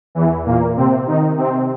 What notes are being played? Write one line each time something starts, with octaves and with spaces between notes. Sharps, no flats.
E2 E3
A#2 A#3
C3 C4
D#3 D#4
C3 C4